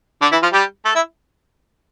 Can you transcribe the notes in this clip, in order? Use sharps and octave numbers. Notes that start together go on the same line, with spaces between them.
D3 D4
E3 E4
F3 F4
G3 G4
A3 A4
E4 E5